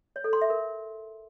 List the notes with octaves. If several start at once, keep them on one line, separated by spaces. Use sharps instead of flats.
C#5
A4
C6
E5
A#4